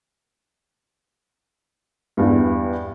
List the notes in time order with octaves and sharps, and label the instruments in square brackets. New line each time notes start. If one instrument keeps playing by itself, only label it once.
[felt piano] E2 G2